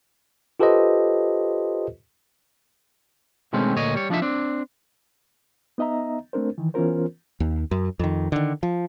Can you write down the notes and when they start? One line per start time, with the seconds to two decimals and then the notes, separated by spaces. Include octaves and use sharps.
0.60 F4 G4 A4 B4 C5 D#5
3.53 B2 D#3 G#3 A3 C4 C#4
3.75 D2 A#2 C#5 D#5
3.95 G3 C#5
4.10 F3 D4 D#4 E5
4.22 C4 D4
5.78 B3 D#4 D#5 E5 A#5
6.33 A3 C4 D4 A#4 C5
6.58 D#3 E3
6.74 E3 B3 C#4 F4 A#4 C5
7.40 D#2
7.71 F#2
7.99 F2 D#3
8.32 D3 D#3
8.63 F3